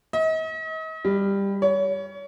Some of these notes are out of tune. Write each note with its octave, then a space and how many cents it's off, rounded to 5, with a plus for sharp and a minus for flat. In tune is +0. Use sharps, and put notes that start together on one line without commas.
D#5 +40
G3 +15
C#5 +25